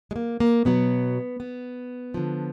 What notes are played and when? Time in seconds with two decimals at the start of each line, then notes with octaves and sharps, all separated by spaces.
0.11 G#3
0.16 A#3
0.40 A#3
0.65 B2 F#3 B3
1.40 B3
2.14 D3 F3